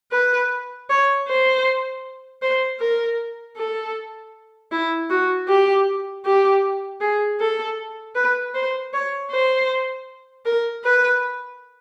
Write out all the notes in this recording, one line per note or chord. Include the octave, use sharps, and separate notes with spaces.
B4
C#5
C5
C5
A#4
A4
E4
F#4
G4
G4
G#4
A4
B4
C5
C#5
C5
A#4
B4